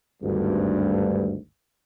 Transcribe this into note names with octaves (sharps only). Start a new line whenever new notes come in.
G#1 D2 G2